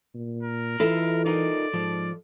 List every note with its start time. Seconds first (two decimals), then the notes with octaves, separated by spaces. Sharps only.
0.14 A#2
0.43 A#4
0.80 E3 E4 F4 A4 D#5
1.26 D#4 F4 A#4 D5
1.74 G#2 F3